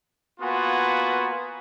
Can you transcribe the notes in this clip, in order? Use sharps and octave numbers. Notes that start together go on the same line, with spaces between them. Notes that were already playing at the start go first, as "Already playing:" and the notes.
A#3 B3 F4 F#4 B4 G#5